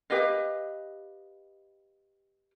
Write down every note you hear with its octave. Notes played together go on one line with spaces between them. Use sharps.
G4 B4 D#5 F5